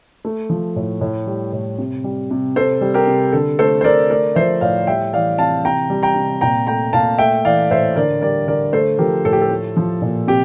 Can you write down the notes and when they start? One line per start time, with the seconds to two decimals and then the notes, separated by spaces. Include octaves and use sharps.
0.25 A3
0.50 F3
0.76 A2
1.01 A2
1.27 G3
1.53 A2
1.78 C3
2.04 G3
2.31 C3
2.56 C3 A4 C5
2.81 G3
2.94 G4 A#4
3.07 C3
3.33 D3 A4
3.59 A3 A4 C5
3.81 C5
3.84 D3 A#4 D5
4.10 A3 A#4 D5
4.35 F3 C5 E5
4.61 A2 D5 F5
4.87 G3 E5 G5
5.13 E3 D5 F5
5.39 C3 F5 A5
5.64 C3 G5 A#5
5.90 G3
6.03 G5 A#5
6.16 C3
6.41 A#2 G5 A#5
6.67 A3 G5 A#5
6.93 A#2 F5 A5
7.18 A3 E5 G5
7.44 E3 D5 F5
7.71 A2 C5 E5
7.96 D3 A#4 D5
8.21 G3 A#4 D5
8.47 D3 A#4 D5
8.73 A3 A4 C5
8.98 F3 G4 A#4
9.25 A2 A4
9.33 G4
9.42 A4
9.51 A3
9.77 F3
10.02 A#2
10.27 C3 G4